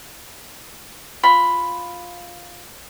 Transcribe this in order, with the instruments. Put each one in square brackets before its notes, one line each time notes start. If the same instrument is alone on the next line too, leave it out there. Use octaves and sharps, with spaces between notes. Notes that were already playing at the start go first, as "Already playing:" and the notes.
[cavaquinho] F4 B5